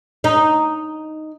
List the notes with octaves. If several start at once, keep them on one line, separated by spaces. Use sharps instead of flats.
D#4